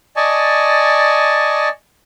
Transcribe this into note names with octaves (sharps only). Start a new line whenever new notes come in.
D5 D#5 G#5 A5 C#6